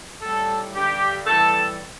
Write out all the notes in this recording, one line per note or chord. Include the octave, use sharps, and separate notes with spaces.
A2 G3 A4
G2 D3 G3 G4
A2 E3 G3 A4